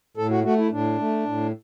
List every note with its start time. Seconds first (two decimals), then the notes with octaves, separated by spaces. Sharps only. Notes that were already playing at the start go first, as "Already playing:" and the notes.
0.17 A2 A4
0.31 F#4
0.44 A3 F#4
0.58 E4
0.71 A2 D4
0.98 A3
1.26 A2